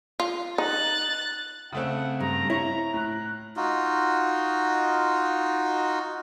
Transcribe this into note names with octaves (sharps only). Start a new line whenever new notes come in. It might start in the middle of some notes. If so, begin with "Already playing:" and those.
F4
D#4 F#6 A6
C#3 A3 C4 F#5
G2 A#5
E4 C#5 A#5
A2 F#6
D#4 F4 F#4